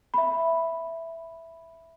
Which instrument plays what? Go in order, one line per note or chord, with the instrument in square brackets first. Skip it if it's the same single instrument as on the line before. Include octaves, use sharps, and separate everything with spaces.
[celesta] E5 B5